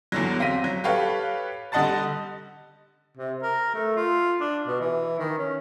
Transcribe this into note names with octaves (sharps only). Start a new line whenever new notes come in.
E2 D3 F#3
C4 F5 A#6 B6 D#7
F#3
G4 A4 B4 C#5 F5
D3 G3 D#5 F#5 A5 A6
C3
A#4
A3
F4
D4
B2
E3
D#3
C#4